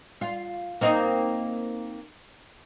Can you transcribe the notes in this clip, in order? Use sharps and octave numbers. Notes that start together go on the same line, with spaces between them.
F4
A#3 C4 D#4